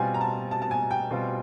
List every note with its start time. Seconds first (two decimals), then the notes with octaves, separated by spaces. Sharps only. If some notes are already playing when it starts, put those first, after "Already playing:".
Already playing: B2 G3 C4 F4 G#5
0.14 A#5
0.21 A5
0.51 A5
0.62 A5
0.71 G#5
0.91 G5
1.11 B2 G3 C4 F4